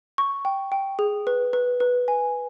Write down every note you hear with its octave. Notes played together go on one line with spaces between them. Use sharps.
C#6
G5
G5
G#4
B4
B4
B4
G#5